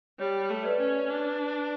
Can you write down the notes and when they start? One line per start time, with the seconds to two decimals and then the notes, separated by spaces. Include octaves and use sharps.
0.19 G3 C#5
0.50 A3
0.64 B4 D5
0.80 C#4
1.10 D4